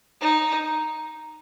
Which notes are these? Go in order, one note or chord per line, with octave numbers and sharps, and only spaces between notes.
D#4